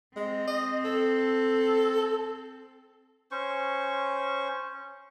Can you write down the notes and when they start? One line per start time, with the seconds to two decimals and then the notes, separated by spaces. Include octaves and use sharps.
0.17 G#3 C4
0.48 D#5
0.85 A4
3.31 C#4 C5 C#6